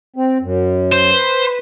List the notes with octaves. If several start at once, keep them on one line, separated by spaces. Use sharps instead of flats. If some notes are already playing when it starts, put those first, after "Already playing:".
C4
F#2
C5
B4